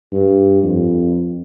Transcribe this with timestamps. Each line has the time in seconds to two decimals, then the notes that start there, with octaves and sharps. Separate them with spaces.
0.12 G2
0.63 F2